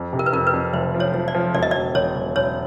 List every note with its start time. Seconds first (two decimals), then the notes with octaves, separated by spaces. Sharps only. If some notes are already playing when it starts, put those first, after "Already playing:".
Already playing: F2
0.13 C3
0.19 A#4
0.26 B4
0.32 F2 A#4
0.47 B4
0.53 F2
0.73 F1 C5
0.94 F3
1.00 C#5
1.14 F3
1.28 D5
1.35 F3
1.54 E1 D5
1.63 D#5
1.71 E1 D5
1.95 E1 C#5
2.16 E1
2.36 E1 C#5